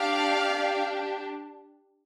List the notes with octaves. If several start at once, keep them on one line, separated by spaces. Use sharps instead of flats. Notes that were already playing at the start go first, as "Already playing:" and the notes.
Already playing: D4 G4 D5 F5
D4 G4